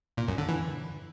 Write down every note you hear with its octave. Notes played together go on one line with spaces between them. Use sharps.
A#2
F#2
D3
E3